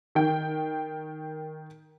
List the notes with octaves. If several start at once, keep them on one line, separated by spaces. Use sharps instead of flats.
D#3 G5